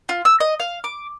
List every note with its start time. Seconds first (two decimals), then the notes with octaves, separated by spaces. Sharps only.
0.09 F4
0.25 E6
0.40 D#5
0.60 F5
0.84 D6